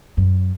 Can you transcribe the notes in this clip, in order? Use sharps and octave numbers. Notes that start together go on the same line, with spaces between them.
F#2